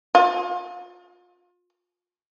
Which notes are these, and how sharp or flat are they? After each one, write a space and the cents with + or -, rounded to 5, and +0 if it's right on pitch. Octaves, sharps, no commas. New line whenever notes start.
F4 +30